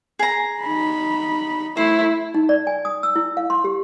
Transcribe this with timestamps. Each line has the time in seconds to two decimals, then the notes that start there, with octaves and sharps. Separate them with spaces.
0.19 G#4 A#5
0.63 D#4 B5
1.77 A3 E4 C5
2.34 D#4
2.49 D5
2.67 G#5
2.85 D#6
3.03 E6
3.16 E4
3.37 F5
3.50 C6
3.64 G4